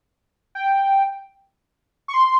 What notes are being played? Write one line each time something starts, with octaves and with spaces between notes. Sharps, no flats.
G5
C#6
C6